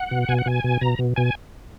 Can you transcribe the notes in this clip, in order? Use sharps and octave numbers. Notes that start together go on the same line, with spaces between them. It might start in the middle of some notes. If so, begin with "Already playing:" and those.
Already playing: F#5
B2
B2 G#5
F#5
B2 G#5
B2
B2 A#5
B2
B2 G#5